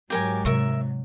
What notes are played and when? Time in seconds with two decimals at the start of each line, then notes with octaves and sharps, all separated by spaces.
0.10 G#2 F#3 G4 A#4 G#5
0.45 C3 A#4 E5 C#6